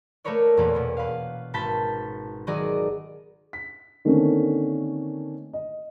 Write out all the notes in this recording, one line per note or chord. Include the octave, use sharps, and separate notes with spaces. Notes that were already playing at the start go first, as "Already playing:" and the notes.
A3 A#3 A#4 B4 C#5 D5
E2 A#2 A#3 B3 C#4
B2 B3
B4 F5
G#1 A5 B5 G6 B6
D#3 F#3 B3 G#4 D5 D#5
B6
D3 D#3 A3 A#3 C4 C#4
D#5